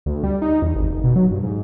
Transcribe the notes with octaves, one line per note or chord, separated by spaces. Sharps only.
D2
G3
D#4
E2
G#1
F1
B2
F#3
G2
G#2